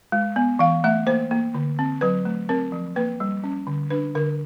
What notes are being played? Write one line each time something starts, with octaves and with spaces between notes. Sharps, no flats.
G#3
B3
E3 F5
A3 E5
A#3 C5
A#3
D3
C4
F#3 B4
A3
C4 A#4
F3
A#3 B4
G3
C#4
D3
D4 B4
D3 A#4